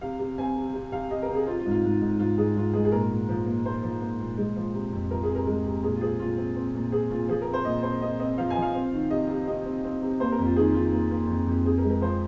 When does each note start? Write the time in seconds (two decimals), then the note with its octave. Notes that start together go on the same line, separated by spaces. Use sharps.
0.01 C3 F5
0.19 C3
0.38 C4 G#5
0.56 C3
0.74 C3
0.92 C3 F5
1.10 C3 D#5
1.22 A#4
1.28 C3
1.35 G#4
1.47 C4 F4
1.59 F4
1.66 G#2
1.71 F4
1.84 G#2
2.02 G#2
2.19 G#2 F4
2.37 G#2 G#4
2.56 G#2 F4
2.73 G#3 G#4
2.85 G#4
2.92 A#2 A#4
3.10 A#2
3.29 F3
3.46 A#3
3.65 A#3 C5
3.83 F3
4.01 A#3
4.19 A#2
4.38 G#3
4.56 F3
4.74 C3
4.92 F2
5.10 F3 A#4
5.23 G#4
5.29 C3
5.35 A#4
5.47 G#3
5.65 C3
5.83 A#2 G#4
5.95 F4
6.01 C4 G#4
6.20 A#2 F4
6.38 C4
6.56 C4
6.75 A#2
6.92 C4 G#4
7.10 A#2 F4
7.28 F3 G#4
7.42 A#4
7.47 C4
7.53 C5
7.65 A#2 D#5
7.83 C4 C5
8.02 C4 D#5
8.20 C4 D#5
8.38 F3 F5
8.50 G#5
8.56 F3
8.62 F5
8.75 C4
8.92 D#3
9.10 C3 D#5
9.29 C3
9.47 C3 D#5
9.65 C4
9.84 C4
10.02 C3
10.20 A#3 C5
10.32 A#4
10.38 F2
10.44 F4
10.56 D#3 G#4
10.74 D#3 F4
10.92 A#3
11.11 A#3
11.28 F2
11.47 F2
11.65 C4 G#4
11.78 A#4
11.84 G#3
11.90 A#4
12.01 F3 C5